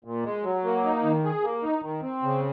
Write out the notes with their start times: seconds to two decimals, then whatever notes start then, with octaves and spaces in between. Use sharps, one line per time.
0.04 A#2
0.25 G#3
0.43 F#3
0.64 A#3
0.84 D#4
1.03 D#3
1.24 G#4
1.43 A#3
1.62 D#4
1.82 D#3
2.02 C4
2.23 C#3